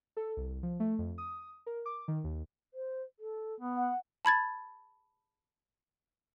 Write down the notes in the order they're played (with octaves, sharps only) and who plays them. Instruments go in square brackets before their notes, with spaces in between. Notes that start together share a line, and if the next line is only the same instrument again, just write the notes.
[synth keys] A4
C2
F3
A3
F2
D#6
A#4
D6
D#3
D#2
[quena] C5
A4
[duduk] B3
[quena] F#5
[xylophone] A5 B5 G#6 A6